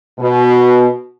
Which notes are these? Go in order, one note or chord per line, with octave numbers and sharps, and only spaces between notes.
B2